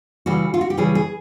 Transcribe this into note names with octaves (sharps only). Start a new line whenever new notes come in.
C#3 E3 G3 F#4
F4
F#4
G4
C#3 E3 G3 G#4
G#4